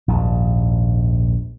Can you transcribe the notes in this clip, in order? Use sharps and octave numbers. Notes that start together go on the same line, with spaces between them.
A#1 D#2 G#2